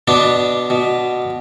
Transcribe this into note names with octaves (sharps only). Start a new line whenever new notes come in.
B2 B3 D4
B2